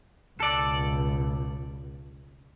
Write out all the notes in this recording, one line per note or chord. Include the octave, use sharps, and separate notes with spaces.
C#2 B2 A4 D5